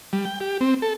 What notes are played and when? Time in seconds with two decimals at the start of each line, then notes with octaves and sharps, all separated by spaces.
0.13 G3
0.25 G5
0.40 G4
0.61 C4
0.82 A4